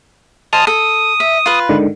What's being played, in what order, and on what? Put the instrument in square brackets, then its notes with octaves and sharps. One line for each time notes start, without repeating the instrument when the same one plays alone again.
[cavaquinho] C5 D#5 G#5 [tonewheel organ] A5 D#6 F6
[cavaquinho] A4 [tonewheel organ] D#6
[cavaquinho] E5
F4 B4
[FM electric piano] G#2 D3 D#3